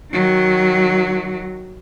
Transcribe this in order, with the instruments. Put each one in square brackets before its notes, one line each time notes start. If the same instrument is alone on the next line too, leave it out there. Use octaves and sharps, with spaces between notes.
[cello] D#3 F#3